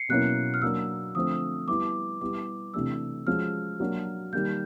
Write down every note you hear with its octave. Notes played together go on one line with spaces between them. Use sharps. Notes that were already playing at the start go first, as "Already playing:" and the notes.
Already playing: C7 C#7
B2 F#3 A#3 C#4 E4 F#6
F6
F#3 A#3 D4 E6
D3 F3 A3 C4 D#6
G3 B3 E4 D6
G3 B3 E4 G4 D6
C3 E3 A3 D4 G4 E6
F3 G#3 C#4 F#4 F6
F#3 A#3 D4 F#4
D#3 G3 A#3 G6